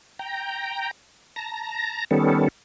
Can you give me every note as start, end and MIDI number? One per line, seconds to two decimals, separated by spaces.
0.19 0.91 79
0.19 0.91 82
1.36 2.05 81
1.36 2.05 82
1.36 2.05 94
2.11 2.48 51
2.11 2.48 55
2.11 2.48 59
2.11 2.48 61
2.11 2.48 69